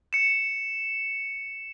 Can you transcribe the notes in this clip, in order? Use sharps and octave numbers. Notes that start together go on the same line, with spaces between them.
C#7 E7